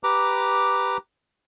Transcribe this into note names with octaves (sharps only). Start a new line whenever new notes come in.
G4 B4 A#5 D6